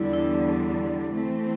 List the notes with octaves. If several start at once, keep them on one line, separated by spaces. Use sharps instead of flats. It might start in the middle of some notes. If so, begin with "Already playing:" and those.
Already playing: E2 D3 G3 D4 E4
E4
E3 A3 C4